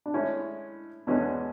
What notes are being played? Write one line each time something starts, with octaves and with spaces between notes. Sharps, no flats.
D4
A2 G#3 C#4 E4
E2 B2 G#3 C#4 D4 G#4